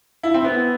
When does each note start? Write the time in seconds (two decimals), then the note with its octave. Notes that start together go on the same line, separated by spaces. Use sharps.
0.23 E4
0.34 C4
0.45 B3